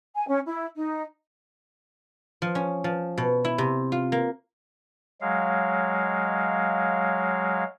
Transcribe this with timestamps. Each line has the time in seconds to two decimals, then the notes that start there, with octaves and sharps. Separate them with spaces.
0.15 G#5
0.27 C#4
0.46 E4
0.75 D#4
2.42 F3
2.55 C#4
2.84 F3
3.18 B2
3.45 E4
3.58 C3
3.92 F4
4.12 A#3
5.21 F#3 G#3 F5